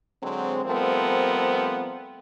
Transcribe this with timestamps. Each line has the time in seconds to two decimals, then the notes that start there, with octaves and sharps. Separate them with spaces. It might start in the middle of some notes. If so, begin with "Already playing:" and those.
0.23 D3 F#3 G#3 C4
0.65 F3 G3 A3 B3 C4 A#4